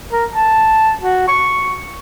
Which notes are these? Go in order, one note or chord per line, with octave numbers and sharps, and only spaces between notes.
A#4
A5
F#4
C#6